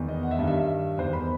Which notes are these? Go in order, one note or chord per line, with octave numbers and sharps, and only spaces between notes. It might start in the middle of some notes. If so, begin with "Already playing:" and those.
Already playing: E2 D#3
D#5
F#5
E5
G2 D#3 D#5
E5
E2 D#3 C5
B5